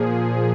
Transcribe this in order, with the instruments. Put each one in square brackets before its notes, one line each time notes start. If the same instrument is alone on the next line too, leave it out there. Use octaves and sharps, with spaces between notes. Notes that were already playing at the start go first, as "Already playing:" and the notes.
Already playing: [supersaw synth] A#2 F3 G#4